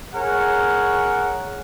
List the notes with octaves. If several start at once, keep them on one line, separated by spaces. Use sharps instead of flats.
G#4 A#4 C#5 F#5